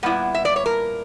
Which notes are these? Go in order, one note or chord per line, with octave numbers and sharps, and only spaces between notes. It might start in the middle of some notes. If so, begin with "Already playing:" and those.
A#2 G3 B3 E4 F#5
E5
D5
C#5
A#4